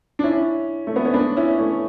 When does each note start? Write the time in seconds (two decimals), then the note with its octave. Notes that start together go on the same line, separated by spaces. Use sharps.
0.19 D4
0.24 C#4 E4
0.87 A3
0.96 B3
1.05 C#4
1.14 B3 D4
1.37 C#4 E4
1.58 A3 C#4